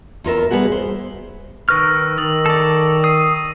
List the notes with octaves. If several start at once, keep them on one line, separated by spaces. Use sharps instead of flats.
E2 F4 A#4 E5
G3 B3 G4 G#4 F#5
C5
D#3 B4 C#6 E6 F6 A#6
D#3 D#6 A6 F#7
A4 D5
D#6 C7 D#7